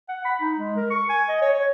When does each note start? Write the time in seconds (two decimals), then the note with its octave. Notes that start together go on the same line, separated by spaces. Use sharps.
0.09 F#5
0.25 B5
0.41 D#4
0.57 G#3
0.77 A#4
0.90 C#6
1.09 G#5
1.29 D#5
1.42 C#5
1.54 C#5